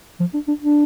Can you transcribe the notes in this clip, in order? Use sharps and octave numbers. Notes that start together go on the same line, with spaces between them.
F3
D4
D4
D4